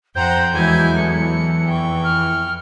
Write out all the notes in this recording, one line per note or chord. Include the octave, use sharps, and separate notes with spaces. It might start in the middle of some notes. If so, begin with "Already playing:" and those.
F2 C5 F#5 G5 A#5 G6
E2 E3 F#3 G#3 E4 G#5
A4 C#7
F2 G5 C#6
F6